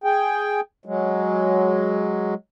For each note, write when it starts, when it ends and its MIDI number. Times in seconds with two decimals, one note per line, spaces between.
0.04 0.60 68
0.04 0.60 79
0.85 2.34 54
0.85 2.34 56